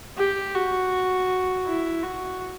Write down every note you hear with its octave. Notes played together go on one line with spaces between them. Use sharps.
G4
F#4
E4
F#4